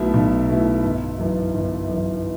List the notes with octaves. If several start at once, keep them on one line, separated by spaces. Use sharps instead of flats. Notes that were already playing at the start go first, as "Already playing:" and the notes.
Already playing: B1 B2 A3 E4
B1
B2 A3 E4
G1
F#2 E3
G1
F#2 E3